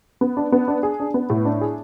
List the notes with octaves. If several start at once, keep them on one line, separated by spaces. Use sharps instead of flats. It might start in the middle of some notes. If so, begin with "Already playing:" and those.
B3
D4
B3
D4
G#4
D4
B3
A2
D4
G#4